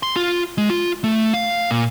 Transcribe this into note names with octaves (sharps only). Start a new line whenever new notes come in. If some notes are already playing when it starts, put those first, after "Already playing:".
C6
F4
G#3
F4
A3
F5
A#2